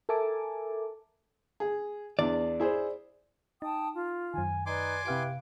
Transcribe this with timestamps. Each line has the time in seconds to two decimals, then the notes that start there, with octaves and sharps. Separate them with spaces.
0.09 A4 A#4 E5 G#5 A5 D6
1.60 G#4
2.19 E2 D4 D5
2.60 E4 G#4 C5
3.62 D#4 G5 A5 D#6
3.94 F4
4.34 F#2 D#3 G#5
4.66 D#4 B4 D5 G#5 C6 D6
5.06 C3 E4 G4 B4 F5 D7